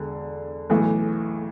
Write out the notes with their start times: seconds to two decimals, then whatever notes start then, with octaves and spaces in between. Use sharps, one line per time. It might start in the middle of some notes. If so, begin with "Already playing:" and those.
Already playing: E1 D3
0.70 B1 A2 E3